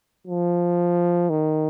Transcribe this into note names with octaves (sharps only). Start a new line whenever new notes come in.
F3
D#3